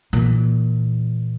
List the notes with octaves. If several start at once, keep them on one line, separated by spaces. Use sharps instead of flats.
A#2 E3